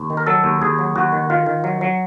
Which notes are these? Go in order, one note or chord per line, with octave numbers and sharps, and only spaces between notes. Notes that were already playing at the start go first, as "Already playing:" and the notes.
Already playing: D#2
D#3
A#4
F#3 A4
D#2
D#2 G#4
F#3
D#2 F#4
D#3
D#3 F4
D#3
F#3
F#3